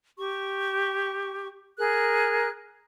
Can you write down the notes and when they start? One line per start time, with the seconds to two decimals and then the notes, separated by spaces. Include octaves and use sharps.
0.17 G4 C#6
1.77 G#4 A#4 F#6